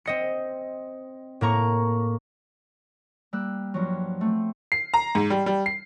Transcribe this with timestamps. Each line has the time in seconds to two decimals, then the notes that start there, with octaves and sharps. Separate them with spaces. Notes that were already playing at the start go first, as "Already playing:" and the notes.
0.06 C4 D#5 C#7
1.41 A2 A#3 A#5 C#6
3.33 G3 A#3 E6 F#6
3.74 G2 F3 F#3
4.21 A3 C4
4.72 C7
4.94 A#5
5.15 G#2
5.30 G3
5.46 G3
5.66 C7